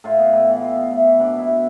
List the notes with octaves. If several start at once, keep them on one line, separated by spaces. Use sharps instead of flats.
A2 F4
B3
A2
E3
A2 F4
B3
A2 E4
E3
B2 D4
B3
E4
B2